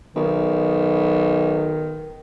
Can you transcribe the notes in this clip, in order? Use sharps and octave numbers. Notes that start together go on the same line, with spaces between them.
B1 D#3